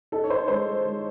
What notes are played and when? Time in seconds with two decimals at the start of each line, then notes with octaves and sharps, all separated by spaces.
0.12 D#4 A4
0.24 C#5
0.30 D#4 C5
0.48 G#3 C5
0.66 G#3
0.85 G#3